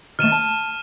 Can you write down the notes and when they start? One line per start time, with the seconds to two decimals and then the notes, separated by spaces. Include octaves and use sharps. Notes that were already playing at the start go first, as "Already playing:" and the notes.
0.19 D#3 A3 F6 D#7 E7
0.32 A5